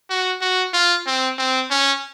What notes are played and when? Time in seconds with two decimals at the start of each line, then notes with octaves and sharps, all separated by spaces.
0.10 F#4
0.41 F#4
0.73 F4
1.07 C4
1.39 C4
1.70 C#4